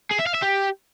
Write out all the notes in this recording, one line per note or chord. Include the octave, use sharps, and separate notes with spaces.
G#4
E5
F5
E5
G4